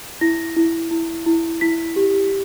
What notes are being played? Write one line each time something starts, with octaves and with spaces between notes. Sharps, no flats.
E4 A#6
E4
E4
E4
E4 B6
G4